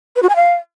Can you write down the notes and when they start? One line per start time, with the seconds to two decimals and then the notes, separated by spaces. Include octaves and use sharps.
0.16 B4
0.22 F#4
0.29 G#5
0.36 F5